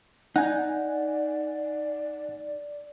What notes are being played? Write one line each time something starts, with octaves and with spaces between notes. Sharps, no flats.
D#4 D5 F#5 G#5